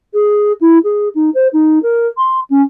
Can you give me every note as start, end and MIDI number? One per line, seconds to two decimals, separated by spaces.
0.13 0.52 68
0.60 0.78 64
0.83 1.08 68
1.15 1.30 63
1.34 1.47 72
1.53 1.79 63
1.82 2.07 70
2.17 2.40 84
2.50 2.61 61